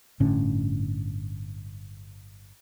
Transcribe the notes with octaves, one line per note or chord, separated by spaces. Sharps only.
G1 A2 D3 C#4